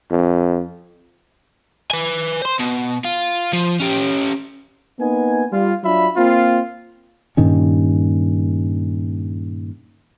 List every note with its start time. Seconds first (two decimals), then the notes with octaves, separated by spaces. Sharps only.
0.11 F2
1.91 B4 G#5
2.41 C5 C6
2.59 B2
3.05 F4
3.53 F3
3.80 C#4 G4
5.00 A#3 B3 D#4 G#5
5.52 G3 F4
5.83 F#3 D4 F4 E5 B5
6.15 A#3 C4 F4
7.37 G2 A#2 D#3 C#4